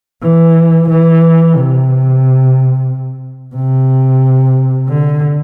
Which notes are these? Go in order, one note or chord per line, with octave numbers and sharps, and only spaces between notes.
E3
E3
C3
C3
D3